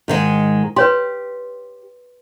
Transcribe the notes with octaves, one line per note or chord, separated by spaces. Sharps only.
G#2 D#3 G#3
G4 B4 C#5 C6